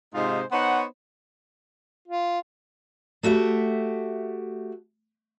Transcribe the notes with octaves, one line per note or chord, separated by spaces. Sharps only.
G#2 C3 G#3 D#4 F4 C5
B3 D#4 C5 C#5 F#5
F4
A3 F#4 G4 E5